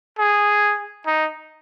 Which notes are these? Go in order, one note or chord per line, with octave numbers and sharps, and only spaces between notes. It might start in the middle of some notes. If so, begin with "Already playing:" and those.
G#4
D#4